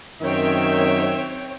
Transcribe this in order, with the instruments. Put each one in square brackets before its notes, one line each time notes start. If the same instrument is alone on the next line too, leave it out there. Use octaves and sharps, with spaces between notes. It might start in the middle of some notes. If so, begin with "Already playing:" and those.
[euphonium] F#2 [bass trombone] D#3 [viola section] C4 C#5 G5 [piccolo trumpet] E5